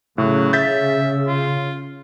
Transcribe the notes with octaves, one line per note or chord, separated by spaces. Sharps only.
A2 C#3 F#3
E5 G6 A6 B6
F4